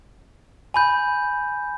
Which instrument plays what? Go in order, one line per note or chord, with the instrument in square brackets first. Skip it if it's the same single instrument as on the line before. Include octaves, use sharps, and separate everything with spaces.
[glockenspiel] G#5 B5 G6